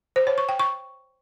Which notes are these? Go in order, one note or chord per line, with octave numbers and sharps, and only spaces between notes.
C5
C#5
C#6
G5
C#6